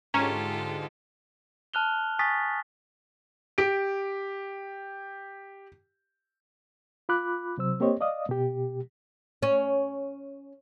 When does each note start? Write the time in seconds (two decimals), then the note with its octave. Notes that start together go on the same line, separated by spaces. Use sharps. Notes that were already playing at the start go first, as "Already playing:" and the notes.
0.14 G#2 D3 G#3 C#4 F4 G4 A4 A#5
1.74 A5 F6 F#6 F7 G7
2.19 G#5 C#6 D#6 A6 B6
3.58 G4 D7
7.09 F4 B5 D6 F#6
7.58 C3 F#3 C5 E6
7.80 A#3 C4 G4 C5 C#5 D#5
8.01 D5 D#5 F5 D#6
8.29 B2 G4
9.43 C#4